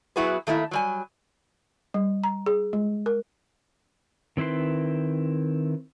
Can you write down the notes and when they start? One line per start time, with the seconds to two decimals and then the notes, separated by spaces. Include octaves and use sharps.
0.16 F#3 B3 E4 F#4 G#4 B4
0.47 D#3 A3 A#3 E4
0.71 F#3 G3 G#5
1.94 G3
2.24 A#5
2.46 G#4
2.73 G#3
3.06 A#4
4.37 D#3 C4 E4 B4 C6